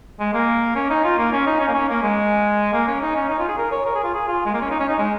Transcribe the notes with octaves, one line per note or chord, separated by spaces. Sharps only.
G#3
A#3
C#4
D#4
F4
A#3
C#4
D#4
C#4
A#3
C#4
A#3
G#3
A#3
C#4
D#4
C#4
D#4
F4
G#4
A#4
C#5
A#4
G#4
F4
G#4
F4
G#3
A#3
C#4
D#4
C#4
D#4
G#3